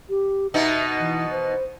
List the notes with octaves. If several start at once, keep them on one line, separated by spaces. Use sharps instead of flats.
G4
B2 B3 D#4 E5
E3
C5